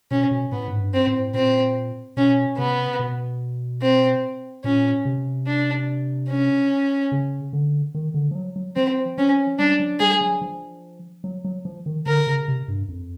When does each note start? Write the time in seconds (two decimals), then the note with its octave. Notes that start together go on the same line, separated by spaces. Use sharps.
0.11 B2 C#4
0.31 B2
0.52 A2 B3
0.68 G#2
0.79 G2
0.94 C4
1.07 A2
1.34 A#2 C4
2.17 B2 C#4
2.58 C3 B3
2.99 B2
3.82 C4
4.64 A#2 C#4
5.05 C3
5.47 D4
6.29 C#4
7.12 C#3
7.53 D3
7.95 D#3
8.14 D3
8.31 F3
8.35 F#3
8.56 F#3
8.76 F3 C4
9.18 F3 C#4
9.59 G3 D4
9.80 F#3
10.00 G3 G#4
10.21 F#3
10.41 F3
11.24 F#3
11.45 F#3
11.65 F3
11.86 D#3
12.06 D3 A#4
12.27 C#3
12.48 C3
12.68 G2
12.89 F2